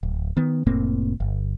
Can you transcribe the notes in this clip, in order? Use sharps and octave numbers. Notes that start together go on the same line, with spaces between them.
D1
D#3 B3
F1 A2 A#3 C4
G1